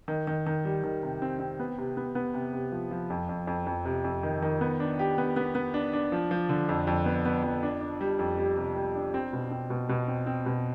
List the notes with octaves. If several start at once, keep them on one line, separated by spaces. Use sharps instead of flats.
D#3
D#3
D#3
G3
D#3
C3
C4
C4
B3
C3
B3
B3
C3
C3
F3
F3
F2
F2
F2
F2
C3
F2
D#3
D#3
B3
D4
G4
B3
B3
B3
D4
D4
F3
F3
D3
F2
F2
B3
B3
F2
D4
D4
G3
F2
G3
C3
G3
D4
C4
B2
C4
B2
B2
C4
C4
B2